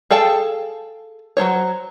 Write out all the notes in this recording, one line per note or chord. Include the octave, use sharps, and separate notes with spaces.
G#4 A4 F5 G5 A5
F#3 A#3 C5 C#5